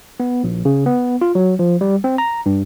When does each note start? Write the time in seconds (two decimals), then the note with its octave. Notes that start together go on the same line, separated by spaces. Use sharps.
0.20 B3
0.44 A#1
0.65 C#3
0.86 B3
1.21 F4
1.35 F#3
1.59 F3
1.81 G3
2.04 C4
2.18 A#5
2.46 G2